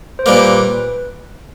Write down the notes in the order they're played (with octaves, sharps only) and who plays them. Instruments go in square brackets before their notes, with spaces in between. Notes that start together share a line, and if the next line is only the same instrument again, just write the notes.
[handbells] C5
[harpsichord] A#2 G3 A#3 [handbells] B4